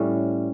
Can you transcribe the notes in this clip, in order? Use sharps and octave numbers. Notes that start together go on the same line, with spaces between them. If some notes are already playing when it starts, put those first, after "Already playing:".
Already playing: A2 G3 C#4